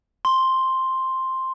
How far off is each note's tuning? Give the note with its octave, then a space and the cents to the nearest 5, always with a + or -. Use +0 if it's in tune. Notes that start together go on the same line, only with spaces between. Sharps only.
C6 +5